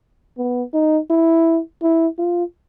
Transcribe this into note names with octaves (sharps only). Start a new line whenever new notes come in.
B3
D#4
E4
E4
F4